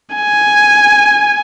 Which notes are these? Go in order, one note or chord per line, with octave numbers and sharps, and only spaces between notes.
G#5